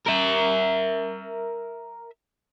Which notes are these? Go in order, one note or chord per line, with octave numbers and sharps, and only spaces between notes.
A#4 E5